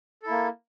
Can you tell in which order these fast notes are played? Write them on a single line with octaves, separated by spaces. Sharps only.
A4 E4 A#3